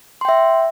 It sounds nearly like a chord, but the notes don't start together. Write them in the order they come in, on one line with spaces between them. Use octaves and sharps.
C6 G5 E5